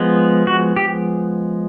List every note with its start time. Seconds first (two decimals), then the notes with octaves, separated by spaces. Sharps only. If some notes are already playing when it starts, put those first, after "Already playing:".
Already playing: F3 G#3 B3
0.47 F#4
0.76 G4